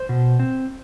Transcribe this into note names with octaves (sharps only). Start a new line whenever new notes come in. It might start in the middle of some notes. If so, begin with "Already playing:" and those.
Already playing: C5
B2
C4